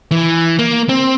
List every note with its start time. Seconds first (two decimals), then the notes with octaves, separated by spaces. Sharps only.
0.11 E3
0.59 A#3
0.89 C4